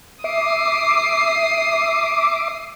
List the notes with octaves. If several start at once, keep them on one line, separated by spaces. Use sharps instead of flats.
E5 D6 D#6 C7